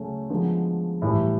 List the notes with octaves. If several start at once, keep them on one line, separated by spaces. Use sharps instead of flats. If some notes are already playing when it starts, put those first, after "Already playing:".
Already playing: C#3 F#3 A3 C#4
D3 F3 G#3 B3 D#4
A2 E3 G3